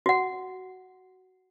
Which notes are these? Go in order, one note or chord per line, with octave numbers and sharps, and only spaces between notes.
F#4 F#5